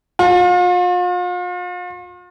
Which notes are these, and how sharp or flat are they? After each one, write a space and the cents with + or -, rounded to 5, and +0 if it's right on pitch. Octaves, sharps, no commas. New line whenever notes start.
F4 +40